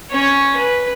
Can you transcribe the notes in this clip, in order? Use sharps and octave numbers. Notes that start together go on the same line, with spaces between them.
C#4 C#5
B4